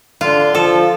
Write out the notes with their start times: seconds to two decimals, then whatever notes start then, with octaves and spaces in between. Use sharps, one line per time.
0.21 D3 F4
0.55 F3 A4